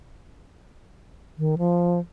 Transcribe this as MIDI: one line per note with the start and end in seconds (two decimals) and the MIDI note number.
1.38 1.55 51
1.58 2.00 53